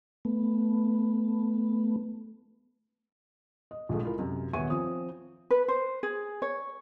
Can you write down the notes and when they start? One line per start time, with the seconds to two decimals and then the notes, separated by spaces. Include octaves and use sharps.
0.25 A3 B3
3.71 D#5
3.89 A#1 A#2 G#3 A3
4.03 E4 F4 A#4
4.19 F#2 C3
4.53 D#1 B3 E5 G#5 C#6 D#7
4.70 F3 C4 D#6
5.51 B4
5.68 C5
6.03 G#4
6.42 C#5